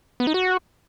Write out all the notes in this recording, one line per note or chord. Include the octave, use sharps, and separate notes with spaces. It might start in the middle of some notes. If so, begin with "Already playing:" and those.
B3
D#4
F#4